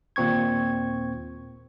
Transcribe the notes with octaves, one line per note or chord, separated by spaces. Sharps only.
D#2 A#2 C4 C#6 G#6